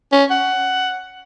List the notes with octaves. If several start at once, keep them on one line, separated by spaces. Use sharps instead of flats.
C#4
F#5